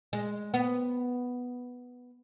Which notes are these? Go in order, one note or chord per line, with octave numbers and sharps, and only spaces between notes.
G#3
B3